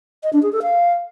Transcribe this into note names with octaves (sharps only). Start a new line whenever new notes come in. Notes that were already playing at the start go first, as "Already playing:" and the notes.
D#5
D4
G#4
A4
F5